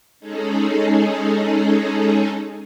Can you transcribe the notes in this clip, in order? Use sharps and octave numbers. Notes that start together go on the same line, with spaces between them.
G#3 C#4 D#4 G#4 A4